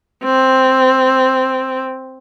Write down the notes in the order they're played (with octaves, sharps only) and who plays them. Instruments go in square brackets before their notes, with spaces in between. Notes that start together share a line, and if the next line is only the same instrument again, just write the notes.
[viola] C4